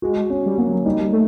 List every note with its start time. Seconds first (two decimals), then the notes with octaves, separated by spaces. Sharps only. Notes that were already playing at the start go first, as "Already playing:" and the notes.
0.02 G#3 F#4
0.30 C#4
0.46 G3
0.58 F#3 A#3
0.85 G3 D#4
1.13 A3